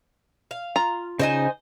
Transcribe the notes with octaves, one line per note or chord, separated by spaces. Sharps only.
F5
F4 A#5
C#3 D#4 C5 D#5 G#5